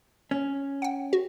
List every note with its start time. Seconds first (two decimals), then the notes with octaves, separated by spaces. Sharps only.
0.31 C#4
0.82 F#5 G5
1.13 F#4